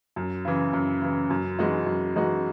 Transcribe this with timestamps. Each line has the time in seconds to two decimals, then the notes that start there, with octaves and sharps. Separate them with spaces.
0.16 F#2
0.45 C#3 E3
0.73 F#2
1.02 C#3 E3
1.30 F#2
1.59 E3 G#3 D#4 F#4
1.86 F#2
2.15 E3 G#3 D#4 F#4